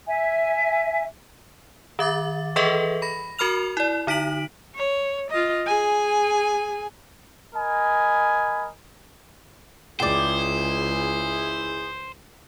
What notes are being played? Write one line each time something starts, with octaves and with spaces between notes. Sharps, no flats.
E5 G#5
D#3 E5 D6 A6
E3 G#4 A4 B4 D#5 E5
B5 A#6
F#4 A#4 B5 F6 F7
E4 D5
D3 D#4 B6 D7 F#7
C#5
F4 D#5
G#4 G#5
A#4 D#5 G#5 B5
C#2 E4 G#4 C5 D5 G5